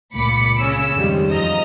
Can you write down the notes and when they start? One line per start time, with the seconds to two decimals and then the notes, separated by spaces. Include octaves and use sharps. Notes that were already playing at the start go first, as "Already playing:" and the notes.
0.15 C#2 A#2 B5 D6 B6 C#7
0.59 C#3 C#4 E6
0.94 F2 D#3 G3 G#3
1.30 E2 F3 D#5 A#5